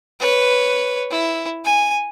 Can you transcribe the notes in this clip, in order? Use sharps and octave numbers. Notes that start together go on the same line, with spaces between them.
B4 C#5
E4
G#5